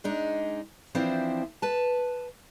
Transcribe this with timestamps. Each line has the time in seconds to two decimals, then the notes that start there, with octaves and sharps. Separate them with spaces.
0.04 G#3 D4 D#4
0.95 E3 F3 C4 D4 E4 C5
1.62 B4 A5